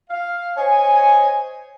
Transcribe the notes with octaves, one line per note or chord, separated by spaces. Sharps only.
F5
C5 C#5 D#5 G#5